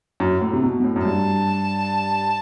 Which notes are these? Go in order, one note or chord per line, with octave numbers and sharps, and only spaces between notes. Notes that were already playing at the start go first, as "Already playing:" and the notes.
F#2
A2
C3
B2
B2
A2
F#2
G2 A5